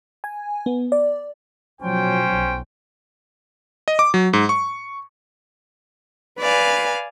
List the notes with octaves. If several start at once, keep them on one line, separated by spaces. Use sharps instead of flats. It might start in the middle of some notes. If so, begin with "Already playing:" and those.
G#5
B3
D5
B2 F3 F#3 C#4 C5 G5
B1
D#5
D6
F#3
G#2
C#6
B4 D5 F5 G#5